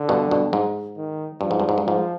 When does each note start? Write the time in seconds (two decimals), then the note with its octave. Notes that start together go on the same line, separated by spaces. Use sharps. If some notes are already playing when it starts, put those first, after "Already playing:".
Already playing: D3
0.09 G2 B2
0.31 G2 B2
0.53 G#2
0.97 D#3
1.41 G2 F3
1.51 G#2
1.60 G2
1.69 G#2
1.78 G2
1.85 G#2 F3